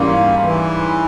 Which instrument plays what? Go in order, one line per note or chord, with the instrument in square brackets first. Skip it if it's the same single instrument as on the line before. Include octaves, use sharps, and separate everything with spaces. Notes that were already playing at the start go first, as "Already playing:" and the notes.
Already playing: [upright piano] G#2 E3 G3 C#4 [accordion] A#3
[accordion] E3